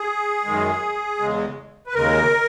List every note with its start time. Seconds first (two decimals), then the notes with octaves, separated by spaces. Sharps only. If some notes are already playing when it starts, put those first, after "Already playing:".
Already playing: G#4
0.45 F#2 D#3 G#3
1.19 E2 C#3 G#3
1.87 B4
1.94 D#2 C#3 G#3 A#4